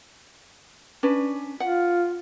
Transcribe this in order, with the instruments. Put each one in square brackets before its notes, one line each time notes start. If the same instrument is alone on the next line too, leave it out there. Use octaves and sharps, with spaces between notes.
[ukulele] C#4 D4 B4
[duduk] F4 [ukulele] F#5